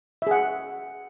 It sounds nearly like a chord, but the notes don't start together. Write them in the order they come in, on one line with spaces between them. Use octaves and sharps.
E5 G#4 F#5